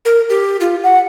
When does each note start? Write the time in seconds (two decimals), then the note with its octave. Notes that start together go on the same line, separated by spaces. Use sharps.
0.05 A#4
0.30 G4
0.60 F4
0.83 F#5